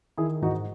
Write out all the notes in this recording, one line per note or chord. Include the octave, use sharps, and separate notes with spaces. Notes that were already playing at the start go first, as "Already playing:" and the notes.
D#3 E4 G#4
G#2 D#4 F#4